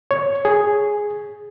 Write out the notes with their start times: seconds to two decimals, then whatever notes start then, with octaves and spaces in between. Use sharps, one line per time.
0.11 C#5
0.45 G#4